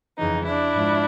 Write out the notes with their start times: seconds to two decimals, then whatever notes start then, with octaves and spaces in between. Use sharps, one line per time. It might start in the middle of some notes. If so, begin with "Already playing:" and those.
0.18 F2 C#3 E3 D#4
0.46 D4 E4
0.74 G#2 F3